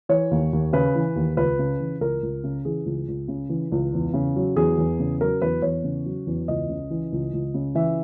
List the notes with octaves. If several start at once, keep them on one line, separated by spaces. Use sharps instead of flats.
E3 C#5
D#2
D#2
C#3 B4
E3
D#2
C#2 B4
C#3
E3
C#2 A#4
C#2
C#3
E3 G#4
C#2
C#2
C#3
E3
C#2
E2
C#3
F#3
E2 G#4
E2
C#3
F#3 A#4
E2 B4
E2 C#5
C#3
F#3
E2
C#2 D#5
C#3
E3
C#2
C#2
C#3
E3 E5